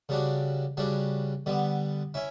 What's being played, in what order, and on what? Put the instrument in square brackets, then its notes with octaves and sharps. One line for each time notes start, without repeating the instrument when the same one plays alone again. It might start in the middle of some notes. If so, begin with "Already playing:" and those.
[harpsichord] C#3 G3 D4 F#4
C#3 G3 D4 F#4
D3 G3 B3
C#4 E4